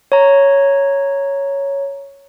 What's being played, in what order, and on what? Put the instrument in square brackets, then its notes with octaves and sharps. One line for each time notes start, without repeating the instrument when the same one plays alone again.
[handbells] C#5 A#5